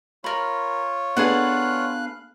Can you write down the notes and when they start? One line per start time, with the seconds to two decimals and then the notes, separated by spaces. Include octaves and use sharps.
0.24 F4 A#4 C#5 B5
1.17 B3 D4 G#4 A4 B4 F5 F#5 F#6